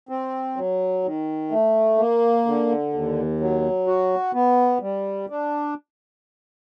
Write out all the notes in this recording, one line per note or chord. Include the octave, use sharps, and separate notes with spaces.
C4
F#3
D#3
A3
A#3
D3
D#2
F#3
F#4
B3
G3
D4